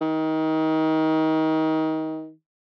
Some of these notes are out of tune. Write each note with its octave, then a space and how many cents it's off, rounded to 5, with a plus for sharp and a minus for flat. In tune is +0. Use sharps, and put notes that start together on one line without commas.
D#3 +25